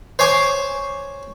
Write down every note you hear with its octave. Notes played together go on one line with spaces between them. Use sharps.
C5 C#5 G#5 D6